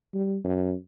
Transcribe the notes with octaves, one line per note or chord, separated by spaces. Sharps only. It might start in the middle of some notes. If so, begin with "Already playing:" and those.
G3
F#2